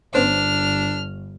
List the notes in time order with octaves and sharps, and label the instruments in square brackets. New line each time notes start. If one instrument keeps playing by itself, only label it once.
[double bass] G1 [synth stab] B3 C#4 C5 [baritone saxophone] D4 [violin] F6